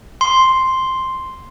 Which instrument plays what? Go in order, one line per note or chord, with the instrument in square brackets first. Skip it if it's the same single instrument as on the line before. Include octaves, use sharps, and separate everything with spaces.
[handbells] C6